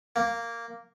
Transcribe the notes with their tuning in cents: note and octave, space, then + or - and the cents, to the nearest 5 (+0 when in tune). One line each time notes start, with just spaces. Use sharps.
A#3 -5